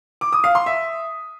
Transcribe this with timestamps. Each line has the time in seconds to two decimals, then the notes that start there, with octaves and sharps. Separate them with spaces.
0.21 D6
0.32 D#6
0.44 F5
0.55 C6
0.66 E5